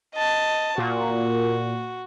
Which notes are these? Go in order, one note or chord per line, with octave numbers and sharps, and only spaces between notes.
D#5 A5
A#2 F#4